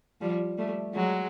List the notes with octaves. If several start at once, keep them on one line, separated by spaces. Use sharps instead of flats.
F3 G3
G3 A3
F#3 G#3